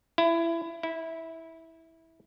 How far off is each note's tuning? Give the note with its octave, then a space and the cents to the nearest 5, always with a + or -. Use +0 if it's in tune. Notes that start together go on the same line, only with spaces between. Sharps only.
E4 +20
E4 -15